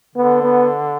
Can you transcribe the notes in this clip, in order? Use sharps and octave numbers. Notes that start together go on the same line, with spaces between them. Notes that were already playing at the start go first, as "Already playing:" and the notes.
D3 B3
B3